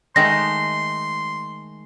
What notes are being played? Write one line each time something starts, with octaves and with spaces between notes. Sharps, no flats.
D#3 G#3 A3 C6 A#6